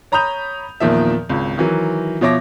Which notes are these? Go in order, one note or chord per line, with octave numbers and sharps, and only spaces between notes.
C#5 A#5 B5 D#6 G6 F7
E2 A#2 D#3 F3 E5
G#1 C#2
D#3 E3 F#3
B2 F3 C#5 E5 D6 A#6